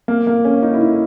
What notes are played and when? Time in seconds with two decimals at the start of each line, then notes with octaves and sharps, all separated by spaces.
0.08 A#3
0.27 A#3
0.45 C#4
0.62 D#4
0.74 E4
0.81 D#4